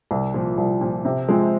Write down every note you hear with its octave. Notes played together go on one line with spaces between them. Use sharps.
C2
A#2 F3
C2
A#2 F3
C3
F3 G#3 C4